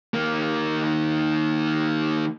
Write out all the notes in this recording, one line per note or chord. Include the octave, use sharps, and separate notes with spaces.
D#3 A#3